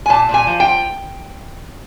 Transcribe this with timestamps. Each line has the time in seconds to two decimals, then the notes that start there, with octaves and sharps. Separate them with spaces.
0.06 G#5
0.10 A#2 A5
0.29 A#2
0.34 G#5
0.47 F3
0.60 G5
0.65 F3